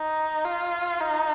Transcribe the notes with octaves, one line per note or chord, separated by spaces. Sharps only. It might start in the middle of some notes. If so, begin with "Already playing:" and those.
Already playing: D#4
F4
D#4